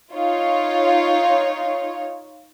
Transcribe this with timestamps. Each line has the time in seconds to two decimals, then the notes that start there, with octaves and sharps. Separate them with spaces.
0.13 D#4 F4 C#5